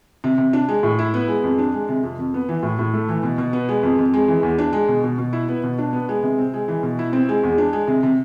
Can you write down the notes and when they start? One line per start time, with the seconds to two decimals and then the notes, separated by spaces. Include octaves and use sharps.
0.24 C3
0.38 C3
0.53 D4
0.69 G#3
0.83 A2
0.99 E4
1.14 B3
1.28 G#3
1.44 F2
1.58 D4
1.74 G#3
1.89 C3
2.03 F2
2.19 F2
2.34 B3
2.49 E3
2.63 A2
2.79 A2
2.94 A3
3.09 E3
3.23 B2
3.38 B2
3.53 B3
3.69 G#3
3.83 F2
3.98 F2
4.13 G#3
4.28 E3
4.43 E2
4.58 D4
4.73 G#3
4.88 B2
5.04 B2
5.18 B2
5.33 E4
5.48 B3
5.64 B2
5.79 D4
5.93 B3
6.09 G#3
6.23 C3
6.38 C4
6.54 G#3
6.68 E3
6.83 B2
6.99 E4
7.13 C4
7.29 G#3
7.43 E2
7.58 D4
7.73 G#3
7.88 C3
8.03 C3